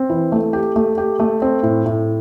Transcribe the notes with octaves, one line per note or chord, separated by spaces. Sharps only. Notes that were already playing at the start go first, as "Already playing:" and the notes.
Already playing: C4
E3
A3
G4
A3
G4
A3
C4
A2
A2